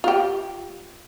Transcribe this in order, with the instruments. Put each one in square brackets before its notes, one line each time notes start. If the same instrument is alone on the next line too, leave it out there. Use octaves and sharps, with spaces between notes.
[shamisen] F4 G4